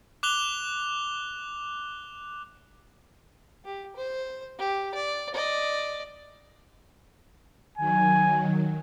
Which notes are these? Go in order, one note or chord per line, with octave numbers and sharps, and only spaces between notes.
D6 F#6 F7 G7
G4
C5
G4
D5
D5 D#5
D#3 F#3 G#5